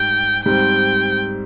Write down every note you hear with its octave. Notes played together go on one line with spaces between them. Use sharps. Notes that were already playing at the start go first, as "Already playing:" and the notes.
Already playing: G#2 G3 G5
G#2 G3 C4 G5